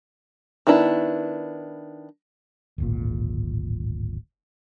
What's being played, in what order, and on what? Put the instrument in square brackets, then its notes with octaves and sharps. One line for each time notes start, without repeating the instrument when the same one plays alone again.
[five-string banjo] D#3 B3 D4 E4 B5
[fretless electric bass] D1 G#1 A#2